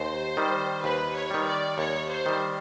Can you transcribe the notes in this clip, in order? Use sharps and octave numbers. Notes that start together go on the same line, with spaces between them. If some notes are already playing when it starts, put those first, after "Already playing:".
Already playing: D#2 C5
D#3 G3
D#2 B4
C#5
D#3 G3
D5
D#2 C#5
C5
D#3 G3